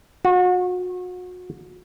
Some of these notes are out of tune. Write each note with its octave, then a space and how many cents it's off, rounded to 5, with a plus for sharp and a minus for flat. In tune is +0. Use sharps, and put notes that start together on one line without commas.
F#4 -35